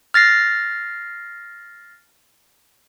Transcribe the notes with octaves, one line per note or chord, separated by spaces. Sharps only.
F6 A6 A#6 C7